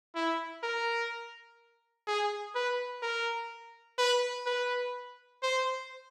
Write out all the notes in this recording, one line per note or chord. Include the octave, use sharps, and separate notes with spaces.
E4
A#4
G#4
B4
A#4
B4
B4
C5